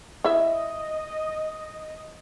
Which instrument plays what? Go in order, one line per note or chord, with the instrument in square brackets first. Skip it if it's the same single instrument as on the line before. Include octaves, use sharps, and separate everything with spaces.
[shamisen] E4 E5 [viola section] D#5